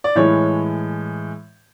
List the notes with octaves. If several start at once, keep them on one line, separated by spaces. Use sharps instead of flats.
D5
A2 E3 G#3 C#5